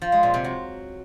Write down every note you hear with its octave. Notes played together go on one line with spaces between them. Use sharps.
F3
G#3
A#2
C3
F#3